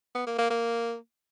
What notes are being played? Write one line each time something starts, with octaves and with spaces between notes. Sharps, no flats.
B3
A#3
A#3
A#3